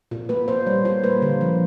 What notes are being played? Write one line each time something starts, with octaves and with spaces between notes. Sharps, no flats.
A#2
A#3 B4
A#2 C5
G3 C#5
A#2 C5
A#3 B4
D3
F3